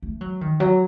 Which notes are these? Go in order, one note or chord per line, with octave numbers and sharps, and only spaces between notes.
A3
F#3
D#3
F#3